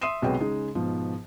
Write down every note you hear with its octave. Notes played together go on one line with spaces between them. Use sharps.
E5 C6 D#6 C7 D#7 E7
B1 C3 G#3 F#4 B4 G5
C#3 G#3 D#4
G#2 B2 F3